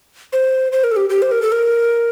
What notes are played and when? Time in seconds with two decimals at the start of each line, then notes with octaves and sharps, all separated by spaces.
0.32 C5
0.72 C5
0.84 A#4
0.91 A4
0.96 G4
1.10 G4
1.22 C5
1.31 A#4
1.42 A4
1.52 A#4